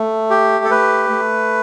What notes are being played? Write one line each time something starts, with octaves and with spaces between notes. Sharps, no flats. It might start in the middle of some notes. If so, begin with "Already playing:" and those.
Already playing: A3
G4
A4
A3 B4
A3